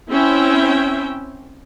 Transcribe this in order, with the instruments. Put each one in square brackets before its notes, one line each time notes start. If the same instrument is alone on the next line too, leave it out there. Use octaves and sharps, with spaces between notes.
[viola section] C4 C#4 E4 E5 G5